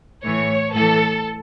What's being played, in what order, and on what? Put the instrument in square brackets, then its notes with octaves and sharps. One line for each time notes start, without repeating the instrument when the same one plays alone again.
[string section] A2 E3 C#5
A2 E3 A4